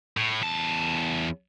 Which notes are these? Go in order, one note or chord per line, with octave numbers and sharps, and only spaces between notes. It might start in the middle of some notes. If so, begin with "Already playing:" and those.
A2
E2 A5